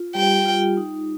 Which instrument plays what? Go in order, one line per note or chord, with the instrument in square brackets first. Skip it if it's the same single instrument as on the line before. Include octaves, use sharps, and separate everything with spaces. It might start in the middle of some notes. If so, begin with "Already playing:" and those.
Already playing: [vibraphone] F4
[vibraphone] G3 G4 [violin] G5
[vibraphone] F4
D#4